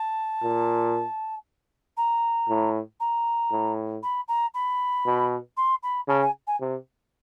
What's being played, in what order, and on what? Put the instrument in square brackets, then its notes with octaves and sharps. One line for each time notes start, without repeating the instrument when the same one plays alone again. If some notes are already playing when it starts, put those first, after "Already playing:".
Already playing: [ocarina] A5
[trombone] A#2
[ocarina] A#5
[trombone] A2
[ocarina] A#5
[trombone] A2
[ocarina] B5
A#5
B5
[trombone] B2
[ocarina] C6
B5
[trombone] C#3 [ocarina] A5
[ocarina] G#5
G#5
[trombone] C3